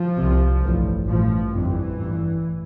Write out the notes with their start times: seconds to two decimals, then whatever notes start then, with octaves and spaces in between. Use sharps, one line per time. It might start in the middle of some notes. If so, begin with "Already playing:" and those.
Already playing: F3
0.17 C2 C3
0.62 A1 G2
1.07 A1 A2 F3
1.52 G1 F2 C3 E3
1.96 A1 G2